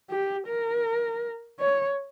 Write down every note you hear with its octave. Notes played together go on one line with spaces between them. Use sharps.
G4
A#4
C#5